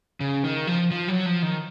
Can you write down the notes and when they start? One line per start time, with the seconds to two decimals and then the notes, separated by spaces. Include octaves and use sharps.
0.20 C#3
0.44 D#3
0.67 F3
0.91 F3
1.08 F#3
1.26 F3
1.43 D#3